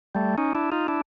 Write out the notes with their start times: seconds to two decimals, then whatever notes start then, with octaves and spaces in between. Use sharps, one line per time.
0.15 G3 A3
0.38 C#4 D#4
0.55 D4 E4
0.72 D#4 F4
0.88 D4 E4